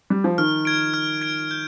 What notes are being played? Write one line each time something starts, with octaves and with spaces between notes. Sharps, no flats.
G3
F3
D#3 F6
G#6 D7
F6
G#6 D7
G6